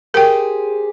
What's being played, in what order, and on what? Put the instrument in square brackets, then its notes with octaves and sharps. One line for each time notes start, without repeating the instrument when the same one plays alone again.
[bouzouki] G4 G#4 C5 [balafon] A#4 G5